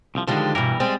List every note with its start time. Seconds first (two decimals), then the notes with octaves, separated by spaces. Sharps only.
0.15 C2 F3
0.28 D3 D#3 F3 G3 G#3
0.55 G2 B2 E3 G3 A#4
0.80 G3 G#3 C4